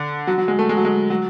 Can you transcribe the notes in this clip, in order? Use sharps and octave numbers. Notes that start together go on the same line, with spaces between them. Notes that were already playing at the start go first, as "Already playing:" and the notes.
Already playing: D3
F#3
F#3
G#3
A3
G#3
F#3
G#3
F#3